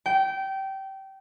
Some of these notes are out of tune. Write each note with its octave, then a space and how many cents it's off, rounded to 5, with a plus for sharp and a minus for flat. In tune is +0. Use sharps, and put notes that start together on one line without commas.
G5 -20